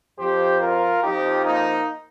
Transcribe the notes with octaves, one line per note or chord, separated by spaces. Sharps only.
F2 F3 G4 C5
F4 A#4
F2 F3 D#4 G4
A#3 D#4